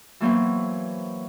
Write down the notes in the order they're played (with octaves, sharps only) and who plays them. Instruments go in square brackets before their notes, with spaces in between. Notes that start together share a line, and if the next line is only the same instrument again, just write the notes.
[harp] E3 F#3 A#3 B3 B4 C5